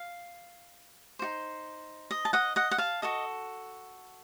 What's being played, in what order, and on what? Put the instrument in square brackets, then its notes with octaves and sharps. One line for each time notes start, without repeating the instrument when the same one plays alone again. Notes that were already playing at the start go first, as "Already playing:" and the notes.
Already playing: [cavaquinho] F5
D#4 F#4 C5
D#5
A5
D#5 F#5
D#5 F#5
F#5
F5 A5
F#4 A4 D#5